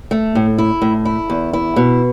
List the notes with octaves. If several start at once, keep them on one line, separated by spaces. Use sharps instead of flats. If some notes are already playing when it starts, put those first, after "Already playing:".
A3
A2
E4
A2
E4
E2
E4
B2